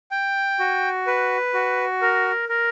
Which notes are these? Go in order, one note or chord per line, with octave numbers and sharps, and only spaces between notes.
G5
F#4
B4
F#4
A#4
A#4